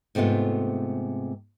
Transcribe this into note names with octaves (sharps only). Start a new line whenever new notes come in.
G#2 C3 A3 B3 F4